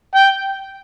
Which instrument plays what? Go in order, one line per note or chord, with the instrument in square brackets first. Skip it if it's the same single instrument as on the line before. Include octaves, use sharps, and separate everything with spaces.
[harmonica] G5